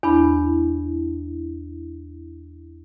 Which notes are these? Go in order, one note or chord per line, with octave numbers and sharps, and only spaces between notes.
E2 D4 E4 B5